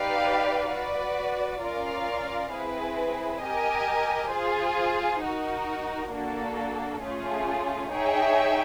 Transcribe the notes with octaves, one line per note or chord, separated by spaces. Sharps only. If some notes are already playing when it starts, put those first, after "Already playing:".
Already playing: D#4 G4 B4 D5 F5
F#4 B4 D5
C#4 F4 A#4 D5 F5
C4 E4 G#4 B4
G4 A#4 D#5 G#5
F4 G#4 C5
D#4 F#4 A#4
A#3 D4 F#4 A4
A3 C#4 F4 G#4
D#4 G#4 C#5 E5 G5